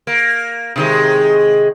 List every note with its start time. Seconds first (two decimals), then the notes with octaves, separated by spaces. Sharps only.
0.07 A#3
0.76 C3 D#3 G#3